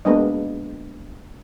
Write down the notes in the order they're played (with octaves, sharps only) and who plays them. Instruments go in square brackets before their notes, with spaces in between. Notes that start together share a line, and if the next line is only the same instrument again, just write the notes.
[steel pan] G#3 A#3 B3 D4 D#5